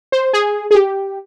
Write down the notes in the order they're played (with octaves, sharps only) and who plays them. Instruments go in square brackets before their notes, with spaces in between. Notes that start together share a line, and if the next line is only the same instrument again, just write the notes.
[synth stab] C5
G#4
G#4
G4